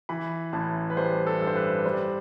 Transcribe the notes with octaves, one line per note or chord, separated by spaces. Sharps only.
E3 B5
A1 A5
B4
G3 C5
A4
G2
C5
B4
G3 C5